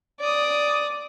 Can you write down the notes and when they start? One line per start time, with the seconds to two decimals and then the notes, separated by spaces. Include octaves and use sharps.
0.20 D5 D#6